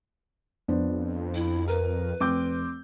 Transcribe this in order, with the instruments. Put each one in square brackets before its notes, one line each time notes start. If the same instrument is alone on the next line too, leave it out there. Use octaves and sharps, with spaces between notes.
[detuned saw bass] F2 [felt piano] B3 D4 C5
[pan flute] E4
[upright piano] A#4 [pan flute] B4
[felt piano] F1 [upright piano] C4 D6 G6